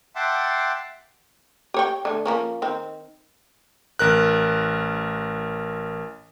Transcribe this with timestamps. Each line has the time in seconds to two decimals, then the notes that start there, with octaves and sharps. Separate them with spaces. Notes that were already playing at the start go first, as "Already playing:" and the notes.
0.16 E5 F#5 G5 A5 C6 D6
1.74 G4 C#5 G5
2.05 D3 A3
2.25 F3 A#3 C#4
2.62 D#3 C4
3.99 A1 A#4 F#6